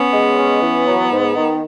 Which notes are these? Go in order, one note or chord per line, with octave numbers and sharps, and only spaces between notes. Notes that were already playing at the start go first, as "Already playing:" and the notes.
Already playing: B3 C#4
G#3
C#4
E3
F#3
G#2
D#3